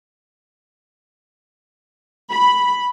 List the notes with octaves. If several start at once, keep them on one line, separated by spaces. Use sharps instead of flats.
B5